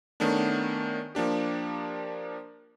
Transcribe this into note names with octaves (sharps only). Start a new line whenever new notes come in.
D#3 A3 B3 C#4 D4
F3 A#3 D4 G4